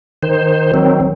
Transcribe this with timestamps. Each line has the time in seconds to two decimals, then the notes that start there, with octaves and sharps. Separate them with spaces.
0.23 D#3 C5
0.74 D#3 F#3 C4